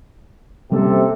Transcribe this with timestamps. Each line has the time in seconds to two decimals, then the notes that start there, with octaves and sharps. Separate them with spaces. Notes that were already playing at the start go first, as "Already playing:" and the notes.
0.72 C3 G3 A#3 C#4 A4